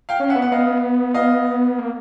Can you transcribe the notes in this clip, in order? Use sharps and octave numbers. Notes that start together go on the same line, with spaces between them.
F5 G5
C#4
E5 F#5
B3
F#5
B3 D#5 F5
D#5 F5
A#3